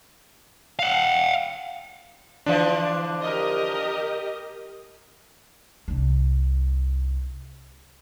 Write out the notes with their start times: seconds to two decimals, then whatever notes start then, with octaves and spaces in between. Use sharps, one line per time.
0.79 F5 F#5
2.46 D3 E3 F3 D4 D5
3.22 G4 A#4 D#5
5.88 C2 D4